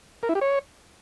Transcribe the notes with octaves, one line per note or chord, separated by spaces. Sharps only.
A#4
E4
G4
C#5